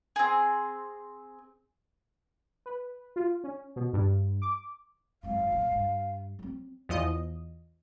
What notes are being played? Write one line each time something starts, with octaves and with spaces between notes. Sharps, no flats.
C4 G#4
B4
F4
C#4
B2
G2
D6
G#1 F#2 F5
F#2 A#2
G2
F#3 C4
E2 F3 D#5